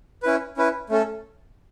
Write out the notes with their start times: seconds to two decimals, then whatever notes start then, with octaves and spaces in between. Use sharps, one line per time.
0.23 C#4 E4 B4
0.57 C#4 E4 B4
0.89 A3 C#4 A4